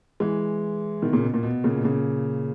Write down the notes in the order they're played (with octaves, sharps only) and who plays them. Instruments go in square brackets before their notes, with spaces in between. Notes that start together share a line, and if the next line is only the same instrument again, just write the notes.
[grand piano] E3 G#3
B2 D#3
A#2 C#3
B2
A#2
B2
A#2 C#3
B2
A#2 C#3